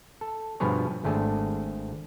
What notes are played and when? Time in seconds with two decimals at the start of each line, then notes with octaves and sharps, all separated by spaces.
0.21 A4
0.60 G2 B2 F3 B3 G#4 C#5
1.04 G#1 A3 D4 G#4 A4